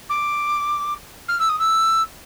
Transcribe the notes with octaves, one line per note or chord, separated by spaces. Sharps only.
D6
F6
E6
D#6
E6